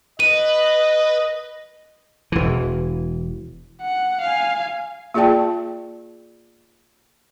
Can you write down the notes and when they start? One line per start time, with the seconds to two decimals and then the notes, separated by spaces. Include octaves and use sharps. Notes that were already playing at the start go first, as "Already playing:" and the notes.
0.20 B4 D#5 D#7
2.32 E1 E3
3.81 F#5
4.22 F5 G#5
5.14 A#3 F4 G#4 D5 G5 A5